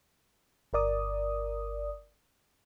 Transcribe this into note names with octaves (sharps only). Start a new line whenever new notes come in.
G1 A#4 D5 D#6